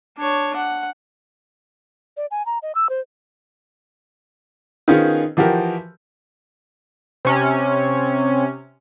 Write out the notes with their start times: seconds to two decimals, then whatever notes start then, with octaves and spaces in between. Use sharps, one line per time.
0.18 D4 C#5
0.56 F#5
2.17 D5
2.31 G#5
2.46 A#5
2.62 D#5
2.75 E6
2.89 C5
4.88 D#3 B3 C#4 F4 G#4 C5
5.37 E3 F3 F#4 G4 A#4
7.25 C3 C#4